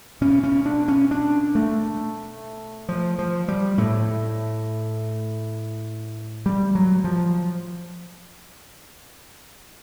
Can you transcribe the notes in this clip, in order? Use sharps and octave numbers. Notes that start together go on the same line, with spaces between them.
B2 C#4
C#4
D4
C#4
D4
A3
F3
F3
G3
A2 A3
G3
F#3
F3